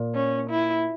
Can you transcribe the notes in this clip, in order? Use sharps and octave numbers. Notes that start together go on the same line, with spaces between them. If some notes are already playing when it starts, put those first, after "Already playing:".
Already playing: A#2
C#4
E4